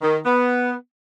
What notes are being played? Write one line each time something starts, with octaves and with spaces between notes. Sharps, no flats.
D#3
B3